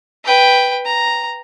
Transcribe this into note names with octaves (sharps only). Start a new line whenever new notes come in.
B4 G5
A#5